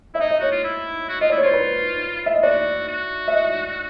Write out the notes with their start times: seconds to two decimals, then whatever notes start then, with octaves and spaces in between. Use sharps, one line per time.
0.14 E4 E5
0.20 D#4 D#5
0.31 D#5
0.39 F#4 C#5
0.52 F4
0.64 E4
1.09 F#4
1.21 F4 D#5
1.30 E4 D5
1.37 C#5
1.43 F4 C5
1.53 B4
2.26 E5
2.34 D#5
2.43 F#4 D5
2.88 F#4
3.28 E5
3.33 D#5